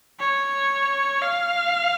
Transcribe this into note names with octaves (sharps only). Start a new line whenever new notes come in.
C#5
F5